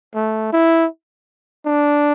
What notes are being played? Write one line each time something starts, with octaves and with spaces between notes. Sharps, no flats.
A3
E4
D4